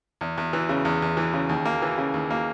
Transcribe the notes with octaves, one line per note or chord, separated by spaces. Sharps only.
E2
E2
E3
C#3
E2
E2
E3
C#3
D#2
A#3
E3
C#3
D#2
A#3